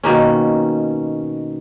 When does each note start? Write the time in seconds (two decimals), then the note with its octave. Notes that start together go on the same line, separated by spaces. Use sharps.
0.04 B2 D#3 A#3 C#4